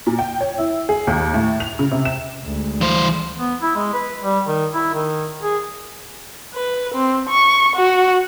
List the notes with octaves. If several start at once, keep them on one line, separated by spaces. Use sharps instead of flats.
A#2
G5
C#5
E4
G#4
D#2
A2
F7
C#3
C3
E7
D2 G#3
E3 C5
B3
E4
G#3
B4
G3
D#3
E4
D#3
G#4
B4
C4
C#6
F#4